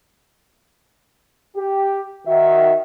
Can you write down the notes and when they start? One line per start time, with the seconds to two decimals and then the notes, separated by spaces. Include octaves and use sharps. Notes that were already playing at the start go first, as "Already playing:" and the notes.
1.56 G4
2.27 D#3 F#4 E5